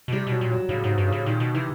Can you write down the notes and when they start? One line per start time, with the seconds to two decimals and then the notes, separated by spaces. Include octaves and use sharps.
0.08 B2
0.12 C3 G3
0.27 B2 F#3
0.41 A#2
0.50 F#3
0.69 A2 C#3
0.84 G#2 C3
0.98 G2
1.07 C#3
1.12 A2
1.26 A#2 D#3
1.40 B2
1.54 C3 E3